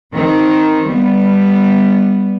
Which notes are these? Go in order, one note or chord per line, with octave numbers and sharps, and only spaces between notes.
D#3 C4
G3 B3